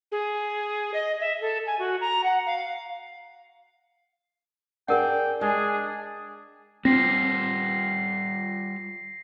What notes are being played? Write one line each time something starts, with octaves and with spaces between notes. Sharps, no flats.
G#4
D#5
E5
A4
G#5
F#4
A#5
F#5
F5
D4 G#4 A#4 F#5 G5
G#3 D4 G#4
G3 C4 F4 A#6 C7